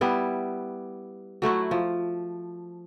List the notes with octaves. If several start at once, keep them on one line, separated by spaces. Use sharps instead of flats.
G3 B3 E4
F#3 A3 E4 F#4
F3